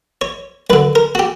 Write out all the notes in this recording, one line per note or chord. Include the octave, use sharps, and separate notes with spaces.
C#5
F#2 D3 B4
A#4
F#4
G4